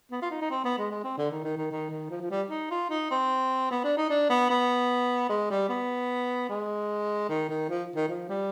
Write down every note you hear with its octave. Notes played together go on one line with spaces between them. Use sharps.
B3
F4
D#4
D#4
C4
B3
G#3
G#3
C4
D3
D#3
D#3
D#3
D#3
D#3
F3
F3
G3
D#4
F4
D#4
C4
B3
D4
D#4
D4
B3
B3
G#3
G3
B3
G#3
D#3
D#3
F3
D#3
F3
G3